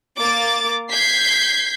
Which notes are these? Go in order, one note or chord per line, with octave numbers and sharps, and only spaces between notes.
A#3 D6 A6
G6 G#6 B6 C7